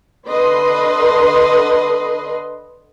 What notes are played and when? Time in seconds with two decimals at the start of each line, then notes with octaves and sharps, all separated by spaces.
0.27 D3 B4 D#5 C6